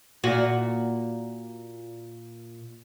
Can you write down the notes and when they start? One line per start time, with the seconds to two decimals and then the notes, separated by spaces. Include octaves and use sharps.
0.24 A#2 F#4